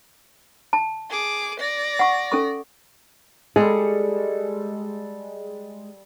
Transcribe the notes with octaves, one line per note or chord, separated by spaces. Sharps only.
A5
G#4 D6
D5 A#6
F#5 C#6
C#4 A4 C#6
G3 G#3 G#4 A4